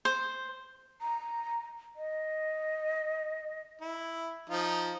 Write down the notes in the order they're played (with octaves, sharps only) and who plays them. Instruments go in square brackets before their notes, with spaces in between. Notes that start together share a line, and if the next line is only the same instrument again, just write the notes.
[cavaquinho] C5
[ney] A#5
D#5
[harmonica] E4
F3 D#4 F4